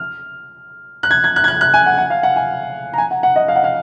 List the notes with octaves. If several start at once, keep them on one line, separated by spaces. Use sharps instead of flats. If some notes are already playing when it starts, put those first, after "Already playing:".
Already playing: F6
F#6
G#6
G#6
F#6
G#6
F#6
F#6
G#5
F#5
F#5
F5
F#5
G#5
A#5
G#5
F#5
F#5
D#5
F5
F#5
F5